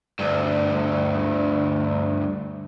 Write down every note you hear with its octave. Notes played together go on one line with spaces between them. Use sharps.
D2 G2